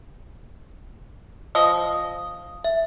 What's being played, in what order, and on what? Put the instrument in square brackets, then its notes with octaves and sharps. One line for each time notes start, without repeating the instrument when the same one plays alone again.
[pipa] F3 D#5 [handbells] D#6
[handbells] E5